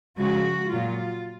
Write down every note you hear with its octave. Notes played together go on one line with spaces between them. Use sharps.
C#3 F3 G#3 F#4
A#2 F#3 F4